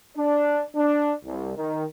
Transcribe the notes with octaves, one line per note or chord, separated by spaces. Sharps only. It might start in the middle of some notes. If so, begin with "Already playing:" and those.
D4
D4
C2
D#3